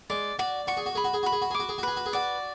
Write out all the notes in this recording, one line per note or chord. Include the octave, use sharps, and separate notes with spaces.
G#3 D5
F#4 D5
F#4 C#6
G#4
F#4
G#4 B5
F#4
G#4
F#4 B5
G#4
F#4
G#4 D6
F#4
G#4
F#4
G#4 B4
F#4
G#4
F#4 D5